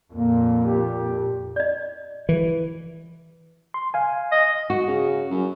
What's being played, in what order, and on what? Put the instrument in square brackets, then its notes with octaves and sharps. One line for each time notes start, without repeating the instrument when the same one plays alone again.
[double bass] F2 A#2 [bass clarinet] A#3
[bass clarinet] G4
[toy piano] D5 D#5
[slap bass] E3
[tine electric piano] C6
F5 G#5
[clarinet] D#5
[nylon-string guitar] F#4
[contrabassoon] C#3
F#2